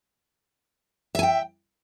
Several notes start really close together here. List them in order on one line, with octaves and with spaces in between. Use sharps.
E5 G#5 G5